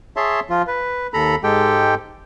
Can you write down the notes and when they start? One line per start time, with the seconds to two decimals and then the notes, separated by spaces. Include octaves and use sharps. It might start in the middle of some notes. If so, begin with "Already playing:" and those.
0.16 G#4 C#5 E5 A5 C6
0.50 F3 F4
0.67 B4
1.14 D#2 A4 A#5 B5
1.44 G#2 G#3 G4 A4 G5